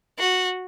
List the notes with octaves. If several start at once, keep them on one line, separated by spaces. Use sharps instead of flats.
F#4